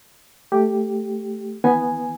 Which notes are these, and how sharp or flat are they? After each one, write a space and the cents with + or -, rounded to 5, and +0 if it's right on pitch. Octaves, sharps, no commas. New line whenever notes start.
A3 +0 G4 +0
E3 -25 B3 +0 G#5 +0